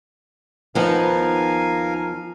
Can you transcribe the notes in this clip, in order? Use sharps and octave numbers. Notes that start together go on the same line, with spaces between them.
D#2 F3 B3 D#4 A#4 F5 G#5